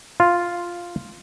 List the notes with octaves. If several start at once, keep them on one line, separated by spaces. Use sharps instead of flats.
F4